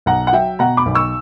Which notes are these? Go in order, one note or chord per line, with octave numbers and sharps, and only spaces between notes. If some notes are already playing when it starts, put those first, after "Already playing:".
B1 F#5 A#5
F#5
F#3 E5 G5
B2 F#5 A#5
B5 D6
B1
C#6 E6